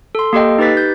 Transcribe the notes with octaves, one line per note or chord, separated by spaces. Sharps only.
A4 C6
A#3 G4 A4 D#5 G5
D#4 G4 B4 A6 B6
G6